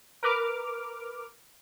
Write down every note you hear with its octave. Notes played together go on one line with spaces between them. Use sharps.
A#4 B4 D6 F6